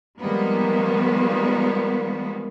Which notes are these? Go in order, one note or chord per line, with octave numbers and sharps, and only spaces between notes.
D#3 F3 G3 G#3 A#3 B3